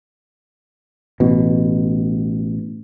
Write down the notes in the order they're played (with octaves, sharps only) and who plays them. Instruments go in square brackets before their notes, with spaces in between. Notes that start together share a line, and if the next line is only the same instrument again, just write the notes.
[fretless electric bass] A1 B2